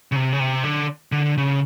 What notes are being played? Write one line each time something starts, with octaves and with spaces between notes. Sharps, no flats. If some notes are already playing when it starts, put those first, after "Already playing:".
C#3
C3
C#3
C3
D3
D3
C#3